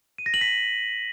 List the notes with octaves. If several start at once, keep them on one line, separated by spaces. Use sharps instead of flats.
D#7
A#6
F#7
B6